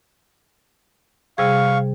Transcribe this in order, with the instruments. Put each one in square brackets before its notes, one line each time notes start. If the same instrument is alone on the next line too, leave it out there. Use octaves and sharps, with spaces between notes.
[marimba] C3 G3 G#4 [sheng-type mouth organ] F5 C#6